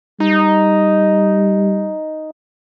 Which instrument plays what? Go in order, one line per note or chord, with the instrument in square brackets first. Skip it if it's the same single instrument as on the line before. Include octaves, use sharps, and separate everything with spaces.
[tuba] G3 [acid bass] D#4